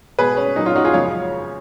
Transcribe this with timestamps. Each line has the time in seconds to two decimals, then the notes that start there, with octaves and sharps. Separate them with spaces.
0.19 B2 G#3 G#4 B4
0.37 C#4
0.56 A#2 F#3 D#4
0.65 C#4 F4
0.76 D#4 F#4
0.84 F4 G#4
0.93 F#2 C#3 F3 G#3 C#5 F5